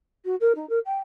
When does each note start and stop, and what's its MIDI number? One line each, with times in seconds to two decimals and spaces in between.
0.25 0.36 66
0.41 0.53 70
0.55 0.68 63
0.69 0.79 70
0.86 0.99 79